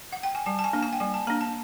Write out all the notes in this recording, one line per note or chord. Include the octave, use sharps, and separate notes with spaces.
F#5
G5
G#5
G3 A5
A5
G#5
A#3 D4
G#5
G5
G3 G#5
A5
A#3 D4 A#5
A5